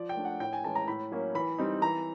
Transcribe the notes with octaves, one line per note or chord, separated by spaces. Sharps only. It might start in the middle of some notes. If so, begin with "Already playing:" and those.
Already playing: F3 D5
G5
A3 D4
F#5
A2 G5
G#5
E3 G#3 C#4 A5
A#5
A2 B5
F#3 A#3 C#4
E3 B5
G3 C4 D#4
E3 A#5